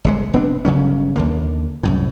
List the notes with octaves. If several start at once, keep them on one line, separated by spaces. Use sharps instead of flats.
G1 C3 G#3
F1 B3 C4 D4
G1 C#3 F#3 C#4
D#2 D3 A#3
C2 F#2 A2